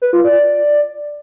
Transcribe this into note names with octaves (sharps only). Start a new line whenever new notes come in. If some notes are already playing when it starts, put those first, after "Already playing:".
B4
F4
D5